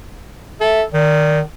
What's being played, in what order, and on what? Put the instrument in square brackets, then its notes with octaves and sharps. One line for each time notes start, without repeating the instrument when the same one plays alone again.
[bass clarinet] A4 [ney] E5
[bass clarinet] D#3 [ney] D5